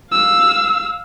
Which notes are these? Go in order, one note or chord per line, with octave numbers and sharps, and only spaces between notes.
F5 E6